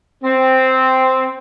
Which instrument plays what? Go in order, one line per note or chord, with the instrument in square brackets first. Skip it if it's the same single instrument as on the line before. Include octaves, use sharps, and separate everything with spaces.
[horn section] C4